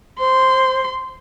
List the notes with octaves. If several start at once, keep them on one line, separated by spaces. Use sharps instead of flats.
C5 C6